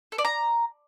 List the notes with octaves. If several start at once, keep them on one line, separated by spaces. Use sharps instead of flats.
A4
D5
A#5